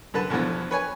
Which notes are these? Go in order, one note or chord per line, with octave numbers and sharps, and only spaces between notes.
F#2 D3 B4 A5
E2 B2 D3 E3 F3
B4 C#5 G#5